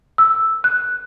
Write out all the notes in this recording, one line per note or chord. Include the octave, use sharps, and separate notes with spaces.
E6
F#6